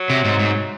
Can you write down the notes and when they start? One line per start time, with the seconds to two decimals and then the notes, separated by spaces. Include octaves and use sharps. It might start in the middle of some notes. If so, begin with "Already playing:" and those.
Already playing: F#3
0.10 C3
0.25 G#2
0.39 G#2